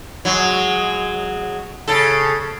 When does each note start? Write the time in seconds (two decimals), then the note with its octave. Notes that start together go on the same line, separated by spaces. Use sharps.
0.25 F#3 G#3
1.88 C#3 A4